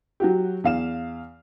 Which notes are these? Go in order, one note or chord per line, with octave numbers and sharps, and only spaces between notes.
F#3 F#4 G4
E2 F5 E7